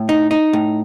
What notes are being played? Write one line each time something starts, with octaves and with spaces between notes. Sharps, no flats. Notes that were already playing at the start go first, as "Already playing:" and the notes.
Already playing: A2
D#4
D#4
A2